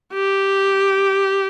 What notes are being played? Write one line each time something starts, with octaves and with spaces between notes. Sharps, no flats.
G4